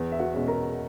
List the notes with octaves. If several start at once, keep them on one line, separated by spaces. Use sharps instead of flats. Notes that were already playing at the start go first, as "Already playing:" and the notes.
Already playing: E2
E5
F#4 F#5
B2 G#3 C#4
A#4 A#5